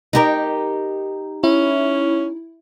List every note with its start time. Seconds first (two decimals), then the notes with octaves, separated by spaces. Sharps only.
0.13 D#4 G4 A#4
1.44 C#4 E4